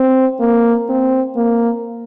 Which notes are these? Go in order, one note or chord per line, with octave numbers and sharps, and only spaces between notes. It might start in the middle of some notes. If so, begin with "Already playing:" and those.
Already playing: C4
A#3
C4
A#3